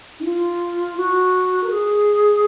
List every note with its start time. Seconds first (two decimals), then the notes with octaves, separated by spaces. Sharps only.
0.19 D#4
0.24 F4
0.97 F#4
1.63 A#4
1.69 G#4